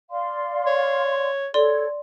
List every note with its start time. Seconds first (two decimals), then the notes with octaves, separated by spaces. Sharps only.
0.11 D5 F5 C6
0.66 C#5
1.54 A4 C#5 D5 C6